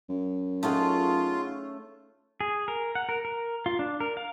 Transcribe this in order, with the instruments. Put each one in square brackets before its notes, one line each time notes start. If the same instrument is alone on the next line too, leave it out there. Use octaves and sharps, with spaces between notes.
[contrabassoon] F#2
[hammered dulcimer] A3 C#4 [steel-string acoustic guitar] D#4 G#4 F#5 [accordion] F4
[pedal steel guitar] G#4
A#4
F#5
A#4
A#4
F4
D4
A#4
F5